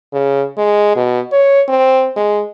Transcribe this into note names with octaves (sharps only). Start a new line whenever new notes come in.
C#3
G#3
B2
C#5
C4
G#3